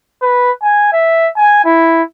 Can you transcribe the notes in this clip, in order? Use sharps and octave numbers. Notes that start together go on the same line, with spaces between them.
B4
G#5
E5
G#5
E4